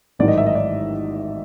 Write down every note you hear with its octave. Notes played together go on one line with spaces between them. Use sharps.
A1 G#2 D#3 F#3 D5
D#5
E5
D#5
D5